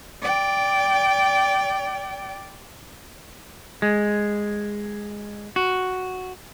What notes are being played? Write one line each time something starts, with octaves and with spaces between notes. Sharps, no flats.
D5 G5
G#3
F#4